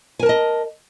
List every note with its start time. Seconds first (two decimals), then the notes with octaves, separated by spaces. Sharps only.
0.19 G#5
0.23 A#4
0.26 A5
0.29 D#5